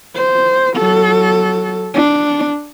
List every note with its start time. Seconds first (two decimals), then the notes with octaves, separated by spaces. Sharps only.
0.15 C5
0.76 F#3 A4
1.94 D4